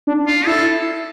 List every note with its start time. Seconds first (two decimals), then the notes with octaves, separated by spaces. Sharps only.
0.07 D4
0.27 F4
0.46 E4 A4